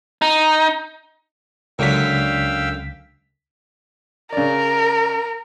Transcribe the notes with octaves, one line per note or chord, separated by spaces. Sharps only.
D#4
C#2 F#2 D3 F#3 F5 G5 E6 B6
C#3 A#4 D5